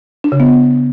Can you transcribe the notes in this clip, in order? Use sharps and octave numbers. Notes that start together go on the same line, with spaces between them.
D4
C#3
B3